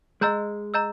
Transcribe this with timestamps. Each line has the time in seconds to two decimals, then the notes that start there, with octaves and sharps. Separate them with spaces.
0.21 G#3 D#5 A#5 E6 G6
0.74 D#5 A#5 E6 G6